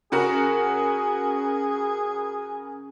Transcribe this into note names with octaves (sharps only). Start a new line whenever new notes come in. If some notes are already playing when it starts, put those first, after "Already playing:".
C#3 F#4 G#4 A#4